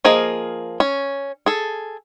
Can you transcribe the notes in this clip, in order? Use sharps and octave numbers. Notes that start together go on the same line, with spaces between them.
F3 A#3 G#4 D#5
C#4
G#4 A4